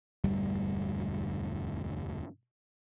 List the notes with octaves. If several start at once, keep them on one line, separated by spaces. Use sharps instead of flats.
E1 D2 G2 G3